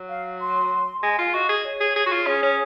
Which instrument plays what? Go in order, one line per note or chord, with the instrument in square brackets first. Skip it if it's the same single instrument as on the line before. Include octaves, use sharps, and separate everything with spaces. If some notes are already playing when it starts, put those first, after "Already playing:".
Already playing: [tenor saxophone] F#3
[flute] F5
C6
[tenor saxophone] G#3 [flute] G#5
[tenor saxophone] F4 [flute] F5
[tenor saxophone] F#4 [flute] D#5
[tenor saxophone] G#4
[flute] C#5
[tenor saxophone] G#4
G#4
F#4
F4
[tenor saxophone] C#4 [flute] G#4
[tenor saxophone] C#4